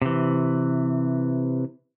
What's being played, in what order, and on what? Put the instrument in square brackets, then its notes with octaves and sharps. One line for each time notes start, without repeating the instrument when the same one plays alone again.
[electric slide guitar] C3 E3